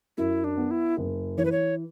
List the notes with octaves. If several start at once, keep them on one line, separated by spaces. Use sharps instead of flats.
F#2 E4
D4
B3
E4
F#1
E3 C#5
B4
C#5